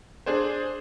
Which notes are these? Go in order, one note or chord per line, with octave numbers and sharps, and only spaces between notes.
D4 G#4 C5